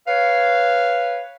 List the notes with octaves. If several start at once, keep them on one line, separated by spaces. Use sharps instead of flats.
B4 C#5 F5